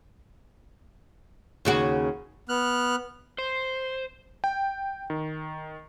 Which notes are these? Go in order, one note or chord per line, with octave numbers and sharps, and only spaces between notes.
D#2 C#3 F#4
B3 F6 F#6
C5
G5
D#3